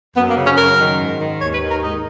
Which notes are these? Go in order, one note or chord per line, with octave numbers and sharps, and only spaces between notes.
F#2 B3
A#3
C#3
C#4
F#2 A#4
D#3
G#2
D#3
D#2 C#5
B4
D#3
A#4
G#2 D#4